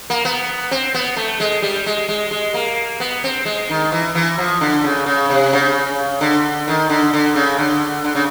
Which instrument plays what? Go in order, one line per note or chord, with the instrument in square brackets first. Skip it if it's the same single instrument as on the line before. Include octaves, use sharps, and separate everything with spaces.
[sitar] A#3
B3
C4
B3
A3
G#3
G3
G#3
G#3
G#3
A#3
B3
C4
G#3
D#3
E3
E3
F3
D3
C#3
C#3
C3
C#3
D3
D#3
D3
D3
C#3
D3
D3
C#3